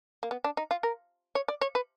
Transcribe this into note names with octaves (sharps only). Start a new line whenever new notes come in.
A#3
B3
D4
D#4
F4
A#4
C#5
D5
C#5
B4